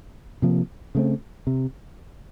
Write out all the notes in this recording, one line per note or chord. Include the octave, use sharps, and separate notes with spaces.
C3 F3 A#3
C#3 A3 C4
C3